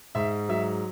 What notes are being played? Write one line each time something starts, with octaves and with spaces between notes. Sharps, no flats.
G#2 E5
F#3 E5